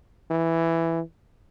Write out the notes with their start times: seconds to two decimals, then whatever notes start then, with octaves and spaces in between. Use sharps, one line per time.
0.31 E3